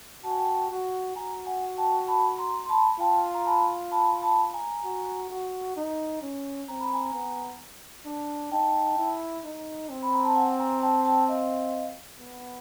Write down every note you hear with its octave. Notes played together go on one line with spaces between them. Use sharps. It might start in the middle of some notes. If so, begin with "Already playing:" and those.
F#4 A5
G#5
G5 A5
F#4
F#4 G#5 A#5
F#5 G#5
G5 A5
A5 B5
A#5 C6
C6
A5 B5
F4 G5 A5
A#5
A5 B5
A5 B5
A5 B5
G#5 A#5
F#4
F#4
D#4
C#4
C4 A#5
B5
G#5 A#5
B3
D4
D#4 G5 A5
E4
D#4
C4
B5
A#5
A5
F#5 G#5
G#5 A#5
G5 A5
G5 A5
D#5 F5
B3